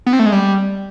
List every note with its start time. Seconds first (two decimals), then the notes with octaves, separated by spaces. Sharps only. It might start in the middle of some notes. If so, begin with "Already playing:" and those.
0.06 B3
0.13 C4
0.19 A3
0.26 G#3
0.32 G3